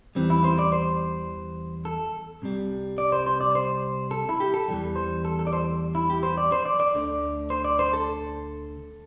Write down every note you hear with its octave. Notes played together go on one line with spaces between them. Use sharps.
E2 E3 G3 C4
E4
C5
D5
C5
A4
C2 C3 G3
D5
C5
C5
D5
C5
A4
E4
G4
A4
E2 E3 G3
C5
A4
A4
D5
C5
E4
G4
C5
D5
C5
D5
D5
D2 D3 A3
C5
D5
C5
A4